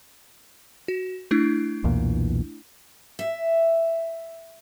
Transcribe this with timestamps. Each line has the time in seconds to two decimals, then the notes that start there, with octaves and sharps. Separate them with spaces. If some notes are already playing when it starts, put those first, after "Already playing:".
0.88 F#4
1.31 A3 D4 E4
1.84 B1 E2 A#2
3.19 E5